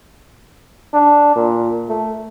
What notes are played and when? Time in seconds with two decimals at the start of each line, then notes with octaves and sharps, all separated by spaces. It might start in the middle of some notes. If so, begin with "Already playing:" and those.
0.94 D4
1.36 A#2
1.89 A3